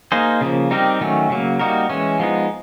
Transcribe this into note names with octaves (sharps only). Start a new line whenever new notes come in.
A#3 D#4 G#4 C5
C#3 F3 A#3
G3 C4 D#4 G4 A#4
D#3 F#3 A3 C#4
C#3 F#3 A#3
G3 A#3 D#4 F#4 A#4
E3 G#3 C#4
F3 G#3 B3 D#4